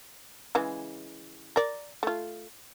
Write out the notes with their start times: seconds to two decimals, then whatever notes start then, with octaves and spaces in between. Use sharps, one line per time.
0.55 C#3 E3 G#3
1.56 A#4 D5
2.03 A3 F4